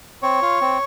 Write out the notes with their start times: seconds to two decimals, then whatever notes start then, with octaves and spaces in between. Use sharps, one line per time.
0.22 C4 C#5
0.42 F4
0.61 C4